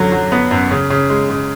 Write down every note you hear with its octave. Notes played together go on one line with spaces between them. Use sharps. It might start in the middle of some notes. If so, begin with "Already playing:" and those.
Already playing: F#2 D3 F#3
F#3
B3
F#2
C#3
C#3
G#3
C#3